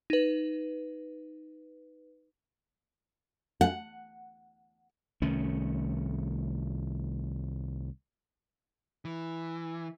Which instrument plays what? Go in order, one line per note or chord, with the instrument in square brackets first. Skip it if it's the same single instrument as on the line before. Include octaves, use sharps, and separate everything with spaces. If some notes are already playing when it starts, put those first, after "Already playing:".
[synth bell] D#4 B4
[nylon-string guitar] F#5
[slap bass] C2 D#3 A3 C#4
[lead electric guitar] E3